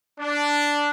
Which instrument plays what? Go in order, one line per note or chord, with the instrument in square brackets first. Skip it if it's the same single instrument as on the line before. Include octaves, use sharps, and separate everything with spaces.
[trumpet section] D4